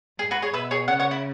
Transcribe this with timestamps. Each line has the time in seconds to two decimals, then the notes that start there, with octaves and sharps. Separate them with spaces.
0.19 G#2 G#4
0.31 F#4 B4
0.42 G#4 C#5
0.53 B2 B4 E5
0.71 G#4 C#5
0.88 C#3 C#5 F#5
1.00 C#5 F#5
1.11 E4